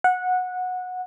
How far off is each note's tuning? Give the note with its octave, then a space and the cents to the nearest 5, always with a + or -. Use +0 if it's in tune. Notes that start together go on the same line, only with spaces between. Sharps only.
F#5 -15